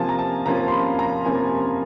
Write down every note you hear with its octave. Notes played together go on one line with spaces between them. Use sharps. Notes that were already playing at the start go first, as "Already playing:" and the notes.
Already playing: C3 F3 A#3 C#4 F4 G#5 A5
A#5
A5
C3 F3 A#3 C#4 F4 A#5
C6
B5
A#5
C3 F3 A#3 C#4 F4 G#5